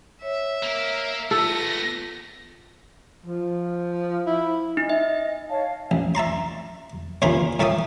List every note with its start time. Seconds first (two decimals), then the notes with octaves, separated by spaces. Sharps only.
0.22 C#5 E5
0.63 A#3 A#4
1.31 A3 B3 F4 A4 A#6
3.26 F3
4.27 E4
4.77 D#4 D#5
4.89 E5
5.50 C#5 F5 A5
5.91 A1
6.15 E5 A5 A#5 C6
7.22 D#2 C#3 E3 F4 A#4 B5
7.59 A2 A3 A4 E5 G5 D#6